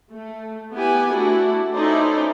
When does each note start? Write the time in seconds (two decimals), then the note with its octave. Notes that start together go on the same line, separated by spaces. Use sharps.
0.12 A3
0.74 B3 E4 G4 B4 G#5
1.13 A3 D4 E4 F#4
1.74 C#4 D#4 E4 A4 C5 D5